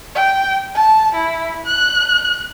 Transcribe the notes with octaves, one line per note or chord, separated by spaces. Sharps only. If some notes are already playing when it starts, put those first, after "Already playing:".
G5
A5
E4
F#6